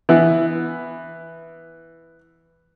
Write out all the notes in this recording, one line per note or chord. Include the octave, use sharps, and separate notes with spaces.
E3 B3 E4